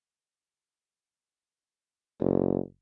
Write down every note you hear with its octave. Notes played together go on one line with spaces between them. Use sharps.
F#1